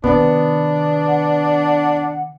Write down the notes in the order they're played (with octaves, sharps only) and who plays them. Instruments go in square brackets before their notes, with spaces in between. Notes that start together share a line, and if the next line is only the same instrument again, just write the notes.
[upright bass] C3 D#3 [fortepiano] B3 [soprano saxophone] D4
[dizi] F#5